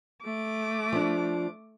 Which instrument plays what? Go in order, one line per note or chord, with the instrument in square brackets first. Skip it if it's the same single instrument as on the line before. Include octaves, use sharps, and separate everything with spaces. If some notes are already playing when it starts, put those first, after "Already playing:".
[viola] A3 D6
[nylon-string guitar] F3 D4